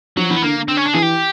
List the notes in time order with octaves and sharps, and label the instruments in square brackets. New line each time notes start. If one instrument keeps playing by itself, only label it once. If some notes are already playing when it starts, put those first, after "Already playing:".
[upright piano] F3 [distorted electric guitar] F#3
[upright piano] E3 [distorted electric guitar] B3
[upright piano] D3 [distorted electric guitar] A#3
[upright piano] D3
[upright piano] D3 [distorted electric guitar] C4
[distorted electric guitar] C#4
D4
[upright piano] E3 [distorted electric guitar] G#4
[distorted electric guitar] G4